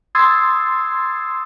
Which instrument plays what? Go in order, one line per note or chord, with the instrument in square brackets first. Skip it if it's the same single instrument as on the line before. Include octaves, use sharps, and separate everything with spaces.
[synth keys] C6 D#6 E6 G#6 A6 C7